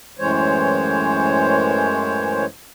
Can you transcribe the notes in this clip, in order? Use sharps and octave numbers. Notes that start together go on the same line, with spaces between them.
F#2 A2 E3 G#3 C5 C#5